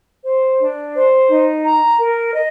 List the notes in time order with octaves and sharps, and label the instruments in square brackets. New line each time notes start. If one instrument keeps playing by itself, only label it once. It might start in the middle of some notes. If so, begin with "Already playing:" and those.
[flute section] C5
D4
C5
D#4
A#5
A#4
D#5